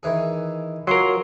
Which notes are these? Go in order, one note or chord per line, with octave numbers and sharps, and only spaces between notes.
D#3 E3 G#4
F#3 F4 A#4 G#5 C6